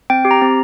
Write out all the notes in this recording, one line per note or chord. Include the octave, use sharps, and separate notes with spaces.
C4 G5
G4
A#5
C4